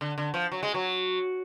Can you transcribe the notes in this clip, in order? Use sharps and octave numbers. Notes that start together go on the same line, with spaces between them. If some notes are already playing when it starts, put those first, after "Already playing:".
D3
D3
F3
F#3
G#3
F#3